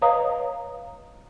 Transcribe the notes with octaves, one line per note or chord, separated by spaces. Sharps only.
B4 C#5 D#5 F5 A#5 D#6